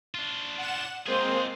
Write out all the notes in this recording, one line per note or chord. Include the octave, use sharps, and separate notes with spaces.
D4 F4
F#5 E7
G#3 A#3 C4 F4 G#4 C5